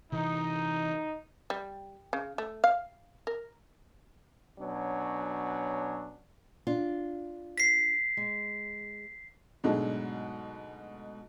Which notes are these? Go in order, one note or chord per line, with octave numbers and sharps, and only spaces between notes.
C3 E3 D#4
G3
C#3
A3
F5
A#4
B2 F#3 C#4 D4
D4 F4
B6 C7
G#3
G#2 B2 F#3 G#3 A3 D4